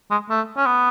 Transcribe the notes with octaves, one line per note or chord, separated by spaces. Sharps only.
G#3
A3
C#4
B3